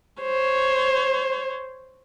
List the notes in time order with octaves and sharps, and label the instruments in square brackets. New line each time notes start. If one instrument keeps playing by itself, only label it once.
[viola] C5 C#5